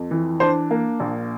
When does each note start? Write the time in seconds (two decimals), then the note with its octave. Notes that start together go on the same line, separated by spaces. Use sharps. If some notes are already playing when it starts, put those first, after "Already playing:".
Already playing: F2
0.11 E3
0.40 D4 C5
0.71 A#3
1.00 A#1